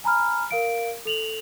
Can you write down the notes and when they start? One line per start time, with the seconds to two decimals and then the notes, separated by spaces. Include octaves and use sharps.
0.04 G#5 A#5 B5 F6
0.51 A#4 F5 D7
1.05 A4 F7 F#7